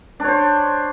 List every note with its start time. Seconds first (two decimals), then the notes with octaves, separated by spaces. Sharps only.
0.20 D4
0.24 C#5
0.28 C5